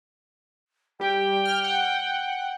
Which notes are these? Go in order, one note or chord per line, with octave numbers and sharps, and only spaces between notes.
G3 G4 G5
F6
F#5